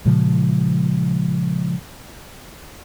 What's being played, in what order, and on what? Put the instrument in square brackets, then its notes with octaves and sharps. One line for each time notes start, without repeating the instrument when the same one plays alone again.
[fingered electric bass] A#2 C#3 F3 G#3